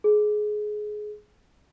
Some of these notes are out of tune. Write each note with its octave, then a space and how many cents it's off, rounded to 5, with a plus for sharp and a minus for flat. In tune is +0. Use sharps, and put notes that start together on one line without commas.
G#4 +20